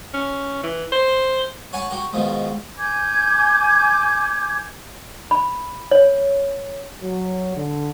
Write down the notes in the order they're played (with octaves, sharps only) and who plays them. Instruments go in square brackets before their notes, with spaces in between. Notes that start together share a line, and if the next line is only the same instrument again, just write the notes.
[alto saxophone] C#4
E3
C5
[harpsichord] C#5 F#5 G#5 A5 B5 C#6
F#4 G4 A#4 F#5
G#2 B2 D#3 F3 G#3
[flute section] G#5 D6 G6 G#6
[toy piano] B5
C#5
[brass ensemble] F#3
D3